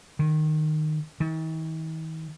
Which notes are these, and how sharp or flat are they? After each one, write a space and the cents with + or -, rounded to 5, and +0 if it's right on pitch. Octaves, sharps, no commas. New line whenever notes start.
D#3 -15
D#3 +45